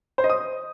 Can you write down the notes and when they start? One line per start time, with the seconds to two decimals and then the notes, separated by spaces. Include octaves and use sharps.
0.18 C5
0.24 D#5
0.30 D#6